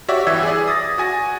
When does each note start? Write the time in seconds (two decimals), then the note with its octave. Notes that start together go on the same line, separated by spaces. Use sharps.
0.08 F#4 G4 C#5 D5 E5
0.27 G1 E3 E5 E6 G#6 B6
0.43 G#4 D5
0.68 D#6 A6 A#6
0.98 F#4 G#5 A#6